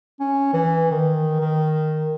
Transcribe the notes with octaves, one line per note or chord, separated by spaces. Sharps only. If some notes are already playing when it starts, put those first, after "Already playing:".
C#4
E3
D#3
D#3